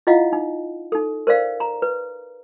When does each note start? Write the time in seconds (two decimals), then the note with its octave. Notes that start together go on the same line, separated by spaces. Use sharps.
0.07 E4 F4 D#5 F5 F#5
0.33 D#4
0.92 D#4 A4
1.27 A#4 C5 D5 F5
1.60 A#5
1.82 B4